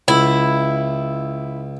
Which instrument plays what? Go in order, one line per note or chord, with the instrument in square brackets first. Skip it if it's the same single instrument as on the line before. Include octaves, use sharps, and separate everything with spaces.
[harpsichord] C#2 [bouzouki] E4